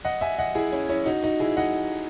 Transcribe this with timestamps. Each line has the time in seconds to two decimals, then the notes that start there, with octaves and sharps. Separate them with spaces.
0.05 D#5 F#5
0.21 E5 G#5
0.39 D#5 F#5
0.55 E4 G#4
0.72 C#4 E4
0.89 C#4 E4
1.06 D#4 F#4
1.23 D#4 F#4
1.40 E4 G#4
1.57 D#5 F#5